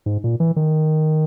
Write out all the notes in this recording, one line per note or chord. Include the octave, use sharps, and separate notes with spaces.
G#2
A#2
E3
D#3